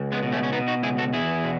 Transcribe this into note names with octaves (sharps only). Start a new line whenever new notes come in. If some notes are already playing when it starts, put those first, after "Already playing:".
Already playing: C#2
G#3 B3
B2
A3 C#4
C#4
B2 B3 D#4
D#4 F#4
C#2 E4 G#4
F#4 A4
E2 E4 G#4
B2